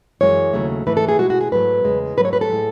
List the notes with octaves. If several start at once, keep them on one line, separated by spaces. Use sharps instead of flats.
F#2 E3 G#3 C#5
D#2 C#3 F#3 A3
G#2 E3 A3 B4
A4
G#4
B2 G#3 F#4
F#4
G#4
G#2 F#3 A3 B4
E2 C#3 G#3
G#2 F#3 A3 B4
C#5
B4
A4
A2 G#3